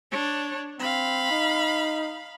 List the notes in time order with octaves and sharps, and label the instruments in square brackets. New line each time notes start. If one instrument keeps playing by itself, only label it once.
[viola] D4 C#5
[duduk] C4 [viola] F5 B5
[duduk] D#4